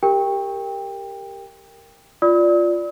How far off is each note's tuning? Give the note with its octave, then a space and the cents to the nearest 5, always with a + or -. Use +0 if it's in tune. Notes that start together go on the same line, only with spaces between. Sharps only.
G4 +10 A#4 -10 G5 +20
F4 +0 D5 +0 D#6 +45